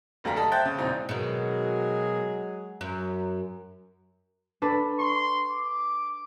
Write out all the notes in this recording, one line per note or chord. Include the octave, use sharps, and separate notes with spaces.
F1 D2 G3 F5 A#5 B6
A4 D#5 A5
C5 E5 G5 F#6 G6 A6
C#3
E1 A#1 E3 C4 D#4
B2 D#3 F#3 G#3 G#4
F#2
D4 A4 B4
C6 C#6
D6